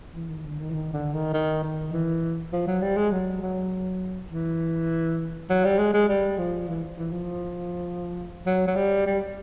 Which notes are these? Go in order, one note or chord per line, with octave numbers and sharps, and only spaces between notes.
E3
D#3
D3
D#3
E3
D#3
D3
D#3
D#3
D#3
E3
F3
F#3
G3
G#3
F#3
F#3
E3
F#3
G3
G#3
G#3
G3
F3
E3
E3
F3
F#3
F#3
G3
G3